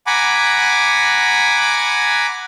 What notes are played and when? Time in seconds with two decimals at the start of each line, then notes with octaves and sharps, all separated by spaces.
0.07 F#5 G#5 A#5 B5 D6